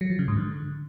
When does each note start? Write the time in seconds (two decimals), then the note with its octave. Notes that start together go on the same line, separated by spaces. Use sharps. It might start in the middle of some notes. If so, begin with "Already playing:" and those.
0.01 F#3
0.10 F3
0.19 C#3
0.28 G#2
0.37 D3